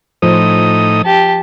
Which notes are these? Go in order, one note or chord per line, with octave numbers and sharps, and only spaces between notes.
A2 F3 D#4 C5 D#6
G4 A5